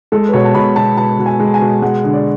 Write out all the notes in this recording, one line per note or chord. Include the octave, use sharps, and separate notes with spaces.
G#3 A4
B4
B2 C#5
A5
B2 B5
B2 A5
B2 A5
B2
G#5
G#3
G#5
B2
G#3 F#5
D3
D5